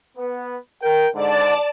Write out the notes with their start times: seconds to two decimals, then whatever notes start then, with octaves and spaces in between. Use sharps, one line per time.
0.17 B3
0.82 A#4 G5
1.14 G#2 D3 D5 A5